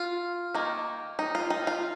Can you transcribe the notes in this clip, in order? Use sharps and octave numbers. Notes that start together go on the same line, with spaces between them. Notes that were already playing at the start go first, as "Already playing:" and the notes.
Already playing: F4
D#3 A#3 D#4
D#4
F4
D#4
F4